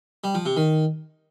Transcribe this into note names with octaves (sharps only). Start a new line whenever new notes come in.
G3
F3
C3
D#3